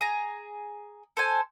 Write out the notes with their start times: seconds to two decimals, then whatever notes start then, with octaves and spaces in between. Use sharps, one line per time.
0.01 G#4 A#5
1.17 A4 C5 G#5